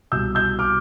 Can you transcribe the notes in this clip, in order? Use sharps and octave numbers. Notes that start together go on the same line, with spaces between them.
C2 B2 G3 E6 G6
E6 G6
D6 F6